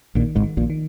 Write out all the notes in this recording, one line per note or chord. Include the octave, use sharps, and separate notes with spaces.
A#1 A#2 D#3
G#1 G#2
D#3
A#1 A#2
D#3